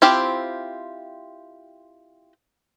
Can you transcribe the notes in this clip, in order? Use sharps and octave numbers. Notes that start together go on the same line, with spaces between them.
C4 E4 F4 G4 C5